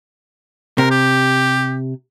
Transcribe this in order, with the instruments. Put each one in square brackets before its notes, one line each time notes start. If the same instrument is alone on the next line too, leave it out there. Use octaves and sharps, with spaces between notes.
[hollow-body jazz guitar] C3 [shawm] A#4
[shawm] G4